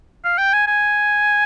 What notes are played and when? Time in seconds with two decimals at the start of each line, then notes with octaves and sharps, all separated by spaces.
0.24 F5
0.38 G5
0.53 G#5
0.67 G#5